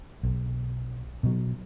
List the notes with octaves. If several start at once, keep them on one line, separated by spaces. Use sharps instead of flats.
B1
B2 F#3